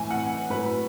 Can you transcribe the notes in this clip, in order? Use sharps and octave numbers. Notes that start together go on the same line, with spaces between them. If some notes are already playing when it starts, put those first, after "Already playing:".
Already playing: A2 E3 G#5
F#5
A2 F#3 B4